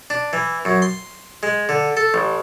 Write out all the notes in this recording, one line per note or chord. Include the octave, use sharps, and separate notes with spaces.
D4
E3
F#2
C6
G#3
D3
A4
A1